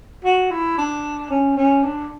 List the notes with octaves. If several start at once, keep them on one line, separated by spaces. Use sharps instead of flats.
F#4
E4
D4
C#4
C#4
D4